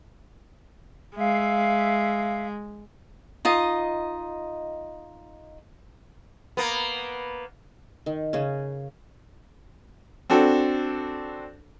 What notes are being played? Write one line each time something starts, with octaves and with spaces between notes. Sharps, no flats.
G#3 E5 F5
D#4 F4 D#5
A#3 B3
D#3
C#3 C#4
C4 D4 F#4 A4